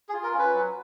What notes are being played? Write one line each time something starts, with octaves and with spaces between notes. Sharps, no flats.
G#4
F4
A#4
C#4 B4
F#3